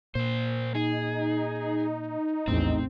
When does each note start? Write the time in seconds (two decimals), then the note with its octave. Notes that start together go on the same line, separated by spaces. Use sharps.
0.15 A#2 A#3 C5
0.75 D#4 G#4
2.48 A#1 E2 A2 C4